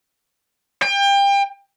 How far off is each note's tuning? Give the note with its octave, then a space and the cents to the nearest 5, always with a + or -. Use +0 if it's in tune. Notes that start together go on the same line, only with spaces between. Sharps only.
G5 +30